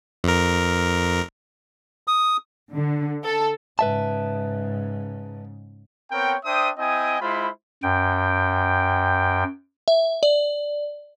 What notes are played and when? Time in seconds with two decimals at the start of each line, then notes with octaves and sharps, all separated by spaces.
0.24 F2 A#4
2.08 D#6
2.73 D3
3.24 A4
3.79 G#2 C#3 B4 E5 A5
6.11 B3 C4 A#4 C#5 G5
6.45 D4 C5 E5 G5 D#6
6.78 C4 E4 D#5 G5 G#5 D#6
7.21 G#3 E4 F4 C5 B5
7.83 F#2 G5
9.88 E5
10.23 D5